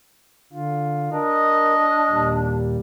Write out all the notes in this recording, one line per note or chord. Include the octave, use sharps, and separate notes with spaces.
D3 F4
D4 A#4 D#5
D#2 A#2 G3